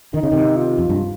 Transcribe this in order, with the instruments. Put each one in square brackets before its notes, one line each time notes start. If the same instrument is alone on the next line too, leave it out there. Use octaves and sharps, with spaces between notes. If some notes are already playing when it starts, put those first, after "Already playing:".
[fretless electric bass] D#3 [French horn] D#4
[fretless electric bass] C#3
C3 D#3
[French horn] F4
[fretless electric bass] F2
G2